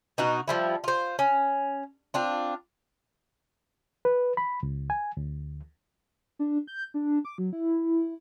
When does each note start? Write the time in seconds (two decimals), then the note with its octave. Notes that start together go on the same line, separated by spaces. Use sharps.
0.18 B2 D#4 F#4
0.48 F3 G3 E4
0.84 F4 C5
1.19 C#4
2.14 C4 D4 F4
4.05 B4
4.37 B5
4.63 C#2
4.90 G#5
5.17 D2
6.39 D4
6.67 G6
6.94 D4
7.25 D6
7.38 F#3
7.53 E4